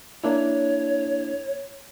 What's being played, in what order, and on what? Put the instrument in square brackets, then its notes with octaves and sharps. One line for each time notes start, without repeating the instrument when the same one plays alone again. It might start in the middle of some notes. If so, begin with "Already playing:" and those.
[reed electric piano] A#3 D4 E4 [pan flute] C#5